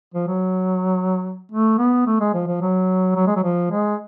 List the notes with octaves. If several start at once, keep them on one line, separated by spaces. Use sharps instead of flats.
F3
F#3
A3
B3
A3
G#3
F3
F3
F#3
F#3
G#3
F#3
F3
G#3